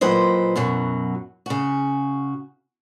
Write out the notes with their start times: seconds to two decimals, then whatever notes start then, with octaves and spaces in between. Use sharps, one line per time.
0.01 A#2 F#3 B4 C5 D#5
0.56 F#2 B2 F#3
1.46 C#3 F#4